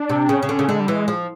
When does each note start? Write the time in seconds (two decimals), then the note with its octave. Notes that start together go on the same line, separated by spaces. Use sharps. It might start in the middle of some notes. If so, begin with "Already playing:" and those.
Already playing: D4
0.10 C3
0.29 C#3 C#4
0.43 C#3
0.49 D3
0.59 C#3
0.68 D3 G#3
0.80 G3
0.88 E3 G#3
1.08 F3